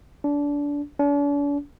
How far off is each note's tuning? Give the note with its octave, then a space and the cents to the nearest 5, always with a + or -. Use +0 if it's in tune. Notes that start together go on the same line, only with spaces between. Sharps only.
D4 -25
D4 -45